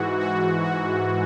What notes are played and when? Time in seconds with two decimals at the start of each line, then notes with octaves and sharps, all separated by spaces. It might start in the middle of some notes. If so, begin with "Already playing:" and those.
Already playing: G#2 E3 F#4
0.20 F#4
0.64 F#4